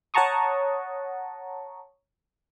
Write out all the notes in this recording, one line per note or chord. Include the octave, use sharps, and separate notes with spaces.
C#5 F#5 A5 A#5 C#6 D#6